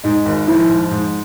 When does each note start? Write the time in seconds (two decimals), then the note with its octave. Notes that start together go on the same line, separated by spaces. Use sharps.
0.04 G#2 D#4
0.26 G#1
0.48 F3 E4
0.69 G#2
0.91 G#2